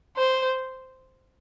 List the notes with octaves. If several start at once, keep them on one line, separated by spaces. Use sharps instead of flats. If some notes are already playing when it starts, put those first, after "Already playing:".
C5